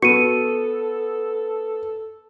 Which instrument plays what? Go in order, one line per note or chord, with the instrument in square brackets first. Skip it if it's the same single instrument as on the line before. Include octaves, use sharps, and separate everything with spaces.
[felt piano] B3 [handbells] F#4 [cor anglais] A4 [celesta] C#7 D#7